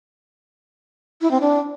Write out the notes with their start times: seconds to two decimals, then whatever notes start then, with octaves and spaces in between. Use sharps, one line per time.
1.21 E4
1.31 C4
1.41 D4